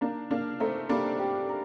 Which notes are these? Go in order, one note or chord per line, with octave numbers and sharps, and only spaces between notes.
A#3 D4 D#4
A#3 D4 F5
A3 C4 D#4
G3 A#3 D4
G4
A#4